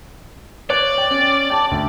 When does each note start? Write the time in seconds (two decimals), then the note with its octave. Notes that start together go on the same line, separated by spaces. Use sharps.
0.70 C#5 D5 F#6
0.98 G5
1.10 C#4
1.50 G5 A5 D6
1.71 D2